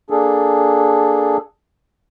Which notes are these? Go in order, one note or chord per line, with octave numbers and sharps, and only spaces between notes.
A#3 D4 G#4 A4